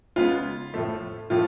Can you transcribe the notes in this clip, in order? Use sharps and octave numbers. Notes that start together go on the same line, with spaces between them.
C#3 G#3 B3 F4
A2 F3 A3
A2 F3 A3 F4